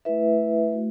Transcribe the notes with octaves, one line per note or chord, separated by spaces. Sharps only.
A3 E4 B4 E5
A3 F#4